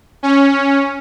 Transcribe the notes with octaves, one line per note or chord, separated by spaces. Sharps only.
C#4